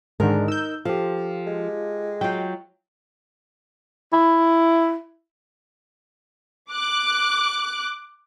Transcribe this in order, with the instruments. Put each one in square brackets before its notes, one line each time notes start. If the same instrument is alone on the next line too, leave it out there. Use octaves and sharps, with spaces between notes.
[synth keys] G#2 D3 D#3 [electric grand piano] G#3 D4 [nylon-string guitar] A#4
[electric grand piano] D#4 [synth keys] E6 G6
[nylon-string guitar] F3 [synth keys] F4 [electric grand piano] G4 A4
[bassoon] G#3
[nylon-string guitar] F#3 F4 [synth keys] G5
[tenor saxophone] E4
[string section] D6 F#6